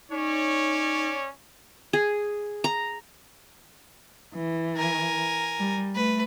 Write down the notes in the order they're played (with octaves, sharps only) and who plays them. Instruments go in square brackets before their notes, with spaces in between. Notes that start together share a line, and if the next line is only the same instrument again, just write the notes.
[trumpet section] C#4 C#5 D5 [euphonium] D#4
[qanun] G#4
A#5
[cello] E3
[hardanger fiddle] A#4 G#5
[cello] G3
[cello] A3 [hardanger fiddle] B4